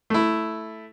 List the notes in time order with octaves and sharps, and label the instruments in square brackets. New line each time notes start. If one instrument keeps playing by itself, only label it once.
[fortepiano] A3 E4